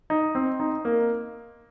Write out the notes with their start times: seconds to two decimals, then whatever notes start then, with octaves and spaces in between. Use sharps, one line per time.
0.10 D#4
0.35 C4
0.60 D#4
0.85 A#3